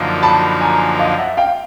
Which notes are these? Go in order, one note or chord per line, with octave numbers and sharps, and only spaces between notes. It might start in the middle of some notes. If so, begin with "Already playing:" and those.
Already playing: F#2 D3 F3 A#3 D#4
A5 B5
G#5 A#5
D#5 F5
E5 F#5
F5 G5